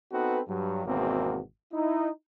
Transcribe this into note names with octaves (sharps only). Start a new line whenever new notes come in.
B3 C4 D#4 F#4 A4 B4
G2 F#3
G#1 E2 B2 A#3 C4 F#4
D#4 E4